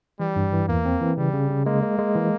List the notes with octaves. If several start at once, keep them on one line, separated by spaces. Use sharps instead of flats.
E3 G3
G2
E3
E2 A#3
C4
E3
C#3 G3
C#3
C#3
G#3 A#3
G#3
G#3
E3